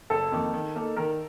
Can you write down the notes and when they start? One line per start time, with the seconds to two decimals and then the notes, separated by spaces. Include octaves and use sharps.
0.10 F#1 A4
0.31 F2 D#3 A#3 D#4
0.54 D#3
0.75 A#3 D#4 A4
0.96 D#3 A#4